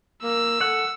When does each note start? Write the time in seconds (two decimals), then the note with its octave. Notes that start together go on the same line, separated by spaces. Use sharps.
0.23 A#3 E6
0.61 A4 F#5